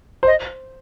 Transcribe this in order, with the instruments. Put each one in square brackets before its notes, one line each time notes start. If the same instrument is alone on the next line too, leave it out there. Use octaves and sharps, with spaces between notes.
[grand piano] C5
[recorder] D#5